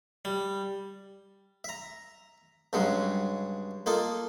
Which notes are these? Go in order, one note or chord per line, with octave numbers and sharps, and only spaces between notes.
G3
E5 A#5
G2 C#3 F#3 G#3
A#3 D#4 F4 A4